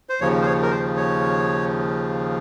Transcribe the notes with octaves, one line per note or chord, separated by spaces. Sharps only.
C5
D#2 C#3 F3 C#5
C5
C#5
A#4
C5
C#5